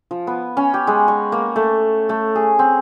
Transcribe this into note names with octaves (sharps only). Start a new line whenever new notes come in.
F3
B3
C#4
G4
G#3
C#6
A#3
A3
A3
G#4
C4